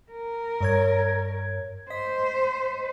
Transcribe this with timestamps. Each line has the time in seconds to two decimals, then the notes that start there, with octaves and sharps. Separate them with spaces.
0.12 A#4
0.61 G2 C#5 G#6
1.90 C5 D#5 B6